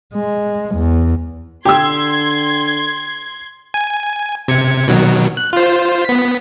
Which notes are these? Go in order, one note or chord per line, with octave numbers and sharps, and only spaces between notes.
G#3
E2
D3 G4 G5 C6 E6 G#6
G#5
C3 G#6 C#7
B2 D#3 F#3
F#6
F4 C5
B3 B6